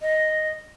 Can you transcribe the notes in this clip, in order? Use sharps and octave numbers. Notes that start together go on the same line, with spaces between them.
D#5